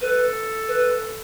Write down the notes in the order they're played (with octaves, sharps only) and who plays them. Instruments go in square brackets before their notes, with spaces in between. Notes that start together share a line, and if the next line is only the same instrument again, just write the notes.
[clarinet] A4 [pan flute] B4
[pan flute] B4